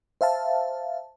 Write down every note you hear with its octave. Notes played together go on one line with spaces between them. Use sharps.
C5 E5 F5 A5